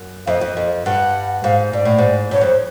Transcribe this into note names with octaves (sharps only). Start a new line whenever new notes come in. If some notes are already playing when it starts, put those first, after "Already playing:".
Already playing: F#2
F2 D#5 F5
F2
F2
G2 F#5
G#2 F5
G#2 D5
A2
G#2
G2 C#5
F2 C5